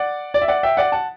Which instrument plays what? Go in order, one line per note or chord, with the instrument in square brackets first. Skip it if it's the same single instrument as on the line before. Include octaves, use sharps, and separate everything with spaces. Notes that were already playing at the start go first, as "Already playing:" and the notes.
Already playing: [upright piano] D5 F#5
D5
E5
D5 F#5
E5 G5
D5 F#5
F#5 A5